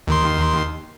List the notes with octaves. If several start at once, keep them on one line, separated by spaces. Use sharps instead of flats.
D#2 D#3 C6